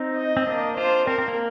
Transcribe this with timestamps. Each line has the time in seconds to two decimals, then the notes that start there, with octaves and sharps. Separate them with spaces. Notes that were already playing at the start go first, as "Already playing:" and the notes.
Already playing: C4 D#4
0.17 D#5
0.37 C4
0.47 A#3 D4
0.77 D4 F4 C5
1.07 C4 A#4
1.18 C4
1.28 A#3